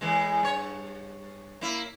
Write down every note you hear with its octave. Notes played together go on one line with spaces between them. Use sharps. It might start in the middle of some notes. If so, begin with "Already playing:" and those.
A2 E3 G#3
G2 C#5
A#3 E4